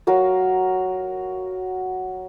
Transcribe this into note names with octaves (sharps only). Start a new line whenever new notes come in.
F#3 F#4 A#4 F5